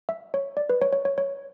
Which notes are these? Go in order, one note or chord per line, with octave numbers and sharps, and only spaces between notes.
E5
C#5
D5
B4
C#5
C#5
C#5
C#5